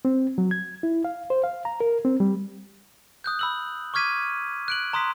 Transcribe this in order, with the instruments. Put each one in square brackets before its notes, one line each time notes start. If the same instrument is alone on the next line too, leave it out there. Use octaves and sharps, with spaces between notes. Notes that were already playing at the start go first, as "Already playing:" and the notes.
[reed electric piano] C4
F#3
G#6
E4
F5
C5
F5
A#5
A#4
C4
G3
[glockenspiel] D#6 F#6 G6
B5 E6 F#7
C#6 D6 F6 G#6 B6 D#7
F#6 D7 F#7
A#5 C6 D#6 F#6 B6